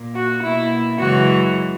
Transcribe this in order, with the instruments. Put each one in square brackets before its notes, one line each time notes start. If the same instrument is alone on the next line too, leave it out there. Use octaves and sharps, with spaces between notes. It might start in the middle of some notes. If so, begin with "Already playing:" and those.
Already playing: [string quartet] A#2 A#3
F#4
B2 A#3 E4
F#2 C#3 E3 G#3 F#4